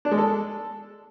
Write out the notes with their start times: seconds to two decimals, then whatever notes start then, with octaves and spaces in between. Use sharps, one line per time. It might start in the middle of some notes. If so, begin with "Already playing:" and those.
0.05 D4
0.11 G#3
0.18 A4